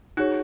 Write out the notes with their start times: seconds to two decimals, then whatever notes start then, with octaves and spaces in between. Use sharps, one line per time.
0.17 D#4 F#4 G#4 C#5